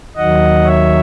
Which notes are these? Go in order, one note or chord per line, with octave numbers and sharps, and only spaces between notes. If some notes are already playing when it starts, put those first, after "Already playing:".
D#2 D#3 F#3 D#5 F#5
C#5 E5